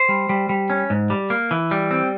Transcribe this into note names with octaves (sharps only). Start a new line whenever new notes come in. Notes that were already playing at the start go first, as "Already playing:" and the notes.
Already playing: C5
G3
G3
G3
C#4
G#2
G3
A#3
E3
G3
C4